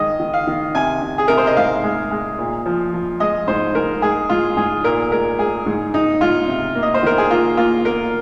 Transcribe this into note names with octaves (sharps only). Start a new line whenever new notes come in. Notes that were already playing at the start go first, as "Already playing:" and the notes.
Already playing: D#3 G#3 D#5
D#3
F5
D#3
C3 G#5
C3
G#4
C3 A#4
C5
D#5
G#2 F5
G#3
G#3
A#2
F3
F3
G#3 D#5
G#2 C5
G#2 A#4
G#3 G#4
G#2 F4
G#2 G#4
A#2 A#4
G#3 A#4
G#3 G#4
G#2
G#2 D#4
G#2 F4
C3
A#3
D#5
C5
D#3 A#4
G#4
A#3 F4
A#3 F4
A#3 A#4